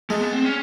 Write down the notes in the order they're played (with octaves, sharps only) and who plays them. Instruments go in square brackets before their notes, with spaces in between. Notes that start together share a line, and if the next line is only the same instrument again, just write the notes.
[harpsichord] G#3 [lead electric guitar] A3
[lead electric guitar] B3
C4
C#4